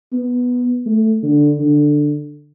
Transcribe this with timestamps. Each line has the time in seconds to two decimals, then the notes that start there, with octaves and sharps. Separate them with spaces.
0.13 B3
0.86 A3
1.23 D3
1.59 D3